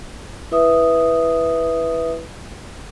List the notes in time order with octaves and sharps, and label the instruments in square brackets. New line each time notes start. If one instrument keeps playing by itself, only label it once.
[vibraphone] E4 B4 E5 D#6